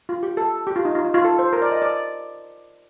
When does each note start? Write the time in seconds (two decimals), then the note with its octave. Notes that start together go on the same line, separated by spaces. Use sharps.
0.09 F4
0.23 G4
0.37 A4
0.67 G4
0.76 F4
0.85 D#4
0.95 F4
1.05 D#4
1.14 F4
1.25 A4
1.39 C5
1.53 A#4
1.62 D5
1.72 D#5
1.82 D5